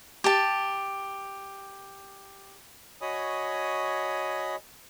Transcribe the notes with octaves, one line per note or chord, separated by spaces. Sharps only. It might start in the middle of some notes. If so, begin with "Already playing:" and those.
G4 A5
F#4 C#5 D#5 G#5 B5 D#6